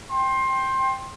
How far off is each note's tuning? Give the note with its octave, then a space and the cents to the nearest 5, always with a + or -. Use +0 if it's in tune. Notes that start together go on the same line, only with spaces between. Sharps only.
G5 +0 C6 +25